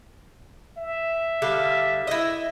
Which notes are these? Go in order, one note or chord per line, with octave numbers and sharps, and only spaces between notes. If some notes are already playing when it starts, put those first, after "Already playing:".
E5
D3 G3 F5
E4 D#5